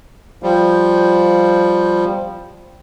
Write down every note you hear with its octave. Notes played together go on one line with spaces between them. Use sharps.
F3 G3